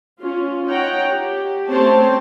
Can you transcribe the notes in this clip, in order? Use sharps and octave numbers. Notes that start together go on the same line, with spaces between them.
C#4 F4
D#4 C#5 F#5 G5 A#5
G4
A3 C4 C#4 C5 C#5 A5